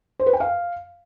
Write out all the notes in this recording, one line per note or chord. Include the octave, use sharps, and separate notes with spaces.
C5
B4
G5
F5